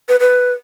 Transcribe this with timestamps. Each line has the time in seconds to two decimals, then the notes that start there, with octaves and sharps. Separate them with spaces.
0.09 B4
0.20 B4